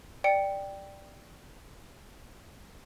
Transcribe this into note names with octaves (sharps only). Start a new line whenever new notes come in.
D5 G5 C#7